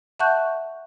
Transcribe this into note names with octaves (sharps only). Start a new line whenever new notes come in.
E5 F#5 A5 C#6 F#6 G6